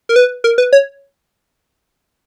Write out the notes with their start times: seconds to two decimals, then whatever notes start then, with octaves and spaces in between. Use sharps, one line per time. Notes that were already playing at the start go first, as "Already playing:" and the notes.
0.09 A#4
0.16 B4
0.44 A#4
0.58 B4
0.73 C#5